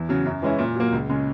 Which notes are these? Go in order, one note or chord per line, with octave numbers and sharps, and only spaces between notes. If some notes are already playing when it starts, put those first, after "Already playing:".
Already playing: E2
C#3 F#3
F#2
E3 G#3 C#4 E4
A#2
F#3 A#3
C#2
C#3 G#3